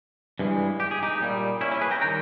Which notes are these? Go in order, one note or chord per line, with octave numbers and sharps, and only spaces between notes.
G2 E3 G#3
G4
G#4
D#4 G4
A#2 G3
C#4 E4
C#4 E4
G#4 B4
G5 A#5
D#3 G3 G5 A#5